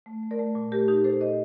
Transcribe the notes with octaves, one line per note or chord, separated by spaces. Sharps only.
A3
A3
A#4 D5
A3
A#2
A3 G4 A#4
A#2 D#4 G4
A#2 A4 C5
A#2 C5 D#5